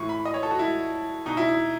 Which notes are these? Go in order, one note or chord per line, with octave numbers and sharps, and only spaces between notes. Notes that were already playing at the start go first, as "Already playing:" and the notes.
Already playing: A2 E3 C#6
B5
D#5
C#5
A4
F#4
E4
B2 D#4
E4
E4